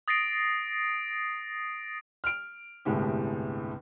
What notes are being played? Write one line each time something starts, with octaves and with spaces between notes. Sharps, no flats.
D#6 A6 A#6 C7 D7
F6 D7
G1 C2 A2 G#3 G4